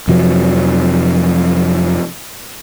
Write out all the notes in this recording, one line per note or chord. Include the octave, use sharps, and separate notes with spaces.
F2 C3 F3 F#3